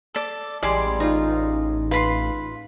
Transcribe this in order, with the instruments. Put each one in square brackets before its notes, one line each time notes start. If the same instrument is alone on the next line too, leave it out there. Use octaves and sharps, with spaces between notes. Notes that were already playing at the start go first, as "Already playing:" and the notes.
[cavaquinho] A4 D5
[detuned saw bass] A1 [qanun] G3 G#3 [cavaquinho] D5 G#5 C6
[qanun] D#4 F4
[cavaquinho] F4 B5 C6 [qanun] B4